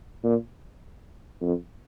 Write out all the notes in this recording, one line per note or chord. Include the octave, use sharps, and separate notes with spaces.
A#2
F2